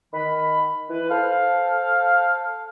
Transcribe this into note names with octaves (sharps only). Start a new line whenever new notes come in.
D#3 B5
E3 E4 B4
A4 C5 F5